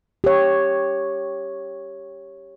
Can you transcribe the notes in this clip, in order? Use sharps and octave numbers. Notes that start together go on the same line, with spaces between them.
G4 C#5